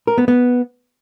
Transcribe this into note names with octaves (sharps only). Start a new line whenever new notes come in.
A#4
B3
B3